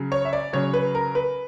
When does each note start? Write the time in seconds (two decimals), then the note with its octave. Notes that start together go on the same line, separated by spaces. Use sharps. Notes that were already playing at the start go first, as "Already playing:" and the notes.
Already playing: C#3 F#3
0.12 C#5
0.25 E5
0.33 D5
0.53 C#3 F#3 C#5
0.73 B4
0.95 A#4
1.15 B4